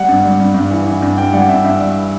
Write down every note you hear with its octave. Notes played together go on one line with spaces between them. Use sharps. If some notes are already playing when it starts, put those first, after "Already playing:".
Already playing: G3 F#5
G2
G3
G2
G2
E3
E3
G2
G2 G5
G3 F#5
G2 E5
G2 E5
G3